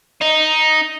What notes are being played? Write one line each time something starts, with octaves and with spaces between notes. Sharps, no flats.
D#4